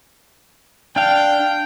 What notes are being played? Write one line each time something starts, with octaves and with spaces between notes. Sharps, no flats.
D4 F5 G5